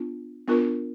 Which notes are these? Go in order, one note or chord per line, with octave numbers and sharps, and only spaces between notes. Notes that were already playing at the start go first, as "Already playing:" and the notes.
Already playing: B3 D4 F4
B3 D4 F4 A#4